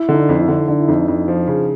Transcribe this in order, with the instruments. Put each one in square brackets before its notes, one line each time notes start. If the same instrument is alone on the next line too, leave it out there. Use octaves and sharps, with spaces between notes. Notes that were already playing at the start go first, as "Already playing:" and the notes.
Already playing: [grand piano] E4
[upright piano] D3
[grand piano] D#4
D4
[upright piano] F2
[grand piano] E4
[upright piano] D3 [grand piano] D#4
[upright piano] D3 [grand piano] D4
[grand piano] E4
[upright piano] F2 [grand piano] D#4
[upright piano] F2
F3
C#3